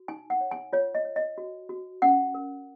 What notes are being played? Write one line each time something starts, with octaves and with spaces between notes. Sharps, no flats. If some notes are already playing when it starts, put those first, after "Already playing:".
Already playing: F#4
D#4 G#5
F#5
C#5
G#5
F4 C#5
D#5
C#5
D#5
F#4
F#4
C#4 F#5
A#4